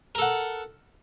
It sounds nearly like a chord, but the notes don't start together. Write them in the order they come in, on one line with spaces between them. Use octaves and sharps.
A#4 A4 F#5